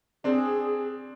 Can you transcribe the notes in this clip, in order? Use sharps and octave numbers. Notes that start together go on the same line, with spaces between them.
C4 D4 G#4